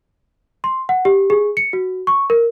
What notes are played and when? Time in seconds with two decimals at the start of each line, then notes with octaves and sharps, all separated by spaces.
0.64 C6
0.89 F#5
1.05 G4
1.30 G#4
1.57 C#7
1.73 F#4
2.07 C#6
2.30 A#4